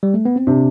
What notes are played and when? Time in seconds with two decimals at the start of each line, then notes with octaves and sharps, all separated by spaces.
0.03 G3
0.14 A3
0.25 B3
0.36 C4
0.47 C3 D4